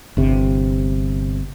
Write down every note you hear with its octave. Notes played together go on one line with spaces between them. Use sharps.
G1 C3